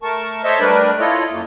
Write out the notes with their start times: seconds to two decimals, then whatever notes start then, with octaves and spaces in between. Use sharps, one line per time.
0.02 A3 A#4 A5 C#6
0.44 A4 C5 C#5 D#5 E5 A5
0.60 G3 A3 D4 A#4 B4 D5
0.99 E4 F4 A4 C#5 D#5
1.31 F#2 A3 A#3